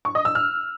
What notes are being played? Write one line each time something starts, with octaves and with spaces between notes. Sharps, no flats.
C#6
D#5
E6
F6